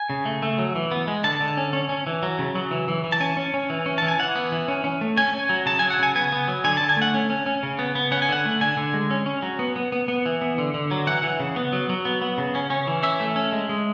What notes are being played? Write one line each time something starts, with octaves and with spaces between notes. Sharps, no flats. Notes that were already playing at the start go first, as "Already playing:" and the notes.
Already playing: G#5
C#3
A3
A3
F#3
E3
B3
G#3
D3 A5
D3
C#4
C#4
C#4
E3
F#3
C#3
F#3
E3
E3
E3
A5
C#4 G#5
C#4
C#4
E3
C#4
E3 A5
G#5
E3 F#5
B3
E3
C#4
C#4
A3
C#4 G#5
C#4
F#3
C#3 A5
F#3 G#5
F#5
C#3 G#5
B3 G#5
B3
F#3
D3 G#5
D3 A5
G#5
A3 F#5
C#4
C#4
C#4
C#3
B3
B3
C#4 F#5
G#5
D3 F#5
A3
D3 G#5
D3
G#3
C#4
C#4
F#3
B3
B3
B3
B3
E3
B3
D3
D3
F#3
E3 F#5
E3
C#3
B3
F#3
F#3
B3
B3
C#3
C#4
C#4
E3
C#4 E5
A3
C#4
G#3
G#3